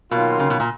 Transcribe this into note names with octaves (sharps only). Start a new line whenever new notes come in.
B2 D#3 F#3 A#3 F4
C#3
B2
A#2